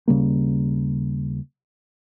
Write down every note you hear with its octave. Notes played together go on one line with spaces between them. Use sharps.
D#2 C#3 G3 A#3